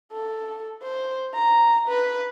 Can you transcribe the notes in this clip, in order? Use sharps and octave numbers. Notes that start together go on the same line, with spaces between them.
A4
C5
A#5
B4